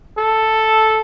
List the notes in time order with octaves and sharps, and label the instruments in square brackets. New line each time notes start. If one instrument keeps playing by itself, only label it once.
[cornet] A4